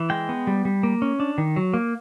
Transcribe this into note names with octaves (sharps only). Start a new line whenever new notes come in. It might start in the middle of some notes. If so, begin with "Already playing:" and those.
Already playing: E3
G#3 G5
B3
G3
G3
A#3
C#4
D4
D#3
F#3
A#3